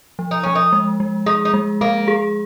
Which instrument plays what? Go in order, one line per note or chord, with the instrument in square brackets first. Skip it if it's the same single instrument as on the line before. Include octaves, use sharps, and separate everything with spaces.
[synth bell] F3
[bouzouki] D#4
[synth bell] F3 [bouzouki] C#4
[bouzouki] D#4
[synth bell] G#3
G#3
[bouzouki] D#4 [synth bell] G#4
[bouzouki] D#4
[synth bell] G#3
[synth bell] G#3 [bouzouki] A#3
[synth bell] G#4